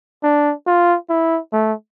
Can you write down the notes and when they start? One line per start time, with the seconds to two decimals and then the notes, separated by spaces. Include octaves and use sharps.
0.23 D4
0.66 F4
1.09 E4
1.53 A3